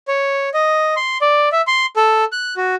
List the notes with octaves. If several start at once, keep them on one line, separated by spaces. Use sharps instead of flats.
C#5
D#5
C6
D5
E5
C6
A4
F#6
F#4